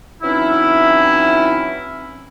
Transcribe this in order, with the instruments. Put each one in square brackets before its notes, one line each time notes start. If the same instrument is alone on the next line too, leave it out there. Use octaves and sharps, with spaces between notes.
[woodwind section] E3 F#3 C4 C#4 D#4 E4